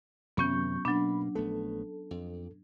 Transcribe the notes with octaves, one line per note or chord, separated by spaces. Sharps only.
F#2 C3 D#3 F#3 B3 C#4 C#6 G6
B2 F#3 A#3 D4 B5
A#1 A3 B3 A4
F2